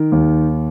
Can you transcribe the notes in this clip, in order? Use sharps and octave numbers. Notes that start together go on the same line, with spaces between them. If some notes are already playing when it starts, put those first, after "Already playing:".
Already playing: D#3
D#2